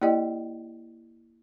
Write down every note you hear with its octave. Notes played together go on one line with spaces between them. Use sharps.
A#3 E4 G4 D5 D#5 G5